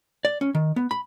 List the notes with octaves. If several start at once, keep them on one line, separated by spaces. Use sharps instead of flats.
D5
C#4
D#3
B3
B5